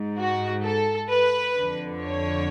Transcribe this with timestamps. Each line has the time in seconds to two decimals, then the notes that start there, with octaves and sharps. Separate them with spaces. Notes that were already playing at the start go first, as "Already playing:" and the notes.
Already playing: G#2
0.18 F#4
0.64 A4
1.10 B4
1.56 D3
1.61 F2
2.03 C#5